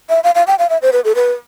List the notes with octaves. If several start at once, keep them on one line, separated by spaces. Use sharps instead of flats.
E5
F5
F5
G5
F5
E5
C5
B4
A4
B4